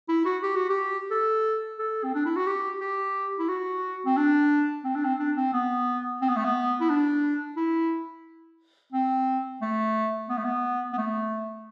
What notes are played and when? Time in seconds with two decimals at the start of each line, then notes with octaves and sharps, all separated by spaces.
0.09 E4
0.25 F#4
0.43 G4
0.56 F#4
0.69 G4
1.11 A4
1.79 A4
2.03 C4
2.14 D4
2.25 E4
2.36 F#4
2.47 G4
2.81 G4
3.39 E4
3.48 F#4
4.06 C4
4.17 D4
4.84 C4
4.95 D4
5.05 C4
5.19 D4
5.36 C4
5.53 B3
6.21 C4
6.29 B3
6.36 A3
6.45 B3
6.80 E4
6.89 D4
7.57 E4
8.93 C4
9.62 A3
10.29 B3
10.37 A3
10.44 B3
10.93 B3
10.98 A3